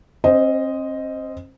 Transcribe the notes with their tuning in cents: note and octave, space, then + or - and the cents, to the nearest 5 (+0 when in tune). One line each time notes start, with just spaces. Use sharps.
C4 +40 C5 -10 D#5 +0